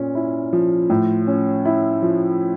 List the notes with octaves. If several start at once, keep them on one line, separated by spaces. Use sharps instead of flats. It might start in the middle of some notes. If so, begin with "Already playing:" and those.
Already playing: A#2 C#4
E4
F3
A2
C#4
E4
F3